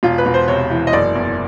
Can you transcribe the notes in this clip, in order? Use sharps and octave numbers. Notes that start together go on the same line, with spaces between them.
E1 F4
B4
E1
C5
C3 C#5
E3
D#5
F#1 D5
E2